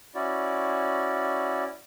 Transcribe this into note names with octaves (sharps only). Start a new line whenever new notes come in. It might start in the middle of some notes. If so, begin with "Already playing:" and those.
C#4 E4 F#4 D5